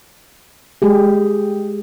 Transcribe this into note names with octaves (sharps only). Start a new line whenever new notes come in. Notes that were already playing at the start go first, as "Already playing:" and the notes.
G#3 G4 G#4